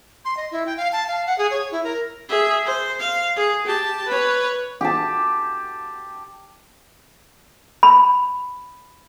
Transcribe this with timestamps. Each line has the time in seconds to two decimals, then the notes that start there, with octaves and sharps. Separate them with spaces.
0.25 C6
0.37 D#5
0.51 E4
0.66 G5
0.77 F5
0.92 A5
1.08 F5
1.26 F#5
1.38 G#4
1.51 C#5
1.71 E4
1.84 A#4
2.29 G#4 E5
2.66 C5
3.00 F5
3.36 G#4
3.66 G4 A5
4.08 B4 C#5
4.81 G4 A5
7.83 B5